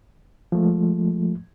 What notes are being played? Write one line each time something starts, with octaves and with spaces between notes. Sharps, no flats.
F3 G#3 A3